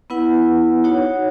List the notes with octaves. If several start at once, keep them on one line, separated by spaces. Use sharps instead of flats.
B3 E4 B4 F#5
D#4 F#4 C#5 F#5